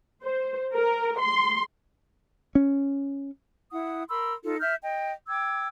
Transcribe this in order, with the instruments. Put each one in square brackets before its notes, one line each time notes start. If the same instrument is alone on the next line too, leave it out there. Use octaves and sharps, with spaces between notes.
[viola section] C5
A#4
C6
[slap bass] C#4
[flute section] E4 F#5 D#6
A#4 B5 C6 E6
D#4 F4 A4
E5 F6 G6
D#5 G5
G5 D6 E6 G#6